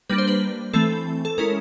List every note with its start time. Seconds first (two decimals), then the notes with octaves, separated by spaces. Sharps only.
0.10 G3 A#3 D4 B4
0.18 C5
0.28 B4
0.73 E3 A3 C4 A4
1.25 A4
1.38 G#3 C#4 E4 A#4